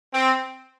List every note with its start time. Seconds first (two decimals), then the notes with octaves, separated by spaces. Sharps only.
0.13 C4